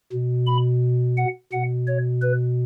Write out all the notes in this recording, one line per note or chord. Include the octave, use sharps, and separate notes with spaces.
B2
B5
F#5
B2 F#5
C#5
B4